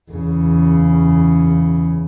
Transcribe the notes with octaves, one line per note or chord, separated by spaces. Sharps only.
E2 C#3